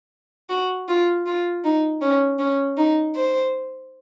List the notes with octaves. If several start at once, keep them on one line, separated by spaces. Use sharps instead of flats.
F#4
F4
F4
D#4
C#4
C#4
D#4
C5